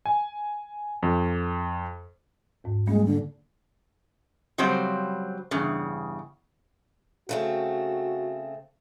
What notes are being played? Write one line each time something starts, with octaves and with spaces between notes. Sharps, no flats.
G#5
F2
D#2 G#2
G3 G#3 A#3 C#4
D3
C#3 F#3 G3 C4 C5
E2 G2 C#3
C#3 A3 C4 F#4